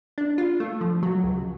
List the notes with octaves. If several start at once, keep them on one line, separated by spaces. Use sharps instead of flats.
D4
F4
A3
F3
F#3
C#2